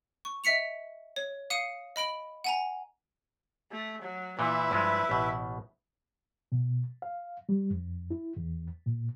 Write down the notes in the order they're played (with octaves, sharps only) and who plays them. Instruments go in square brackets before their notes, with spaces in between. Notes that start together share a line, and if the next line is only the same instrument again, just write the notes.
[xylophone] C#6
D#5 E5 B6 C#7 F7
C#5
F5 D#6 C#7 D#7
D#5 B5 D7 F#7
F#5 G#5 A#5
[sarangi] A3
F#3
[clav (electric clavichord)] A#2 E3 [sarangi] E4 [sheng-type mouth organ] B4 E5
[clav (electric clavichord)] G2 F3 G#3
A1 B2
[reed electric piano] B2
F5
G3
F2
E4
E2
A#2